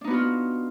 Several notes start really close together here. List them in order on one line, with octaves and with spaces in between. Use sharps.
D4 D#4 B3 F#4 F4